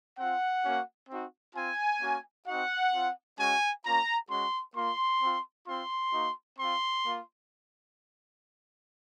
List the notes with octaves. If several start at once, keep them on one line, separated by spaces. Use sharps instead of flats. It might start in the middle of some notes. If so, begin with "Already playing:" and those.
C4 F4 F#5
A#3 C#4 F#4
C4 D#4 F#4
C4 F4 G#5
A#3 C#4 F#4
C4 D#4 F#4 F#5
C4 F4
G#3 C#4 F#4 G#5
A#3 C#4 F4 A#5
G#3 C#4 F#4 C6
A#3 F4 C6
C4 F4
C4 F4 C6
A#3 D#4 F#4
C4 F4 C6
A#3 F4